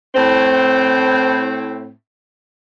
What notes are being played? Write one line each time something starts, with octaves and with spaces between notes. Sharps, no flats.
A2 C4